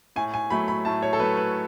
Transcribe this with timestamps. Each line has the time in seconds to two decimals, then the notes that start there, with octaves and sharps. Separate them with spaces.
0.16 A2 G#5
0.34 G#5
0.50 F#3 A3 B5
0.68 B5
0.85 A2 A5
1.02 C#5
1.13 A4
1.19 F#3 A3 B4
1.37 B4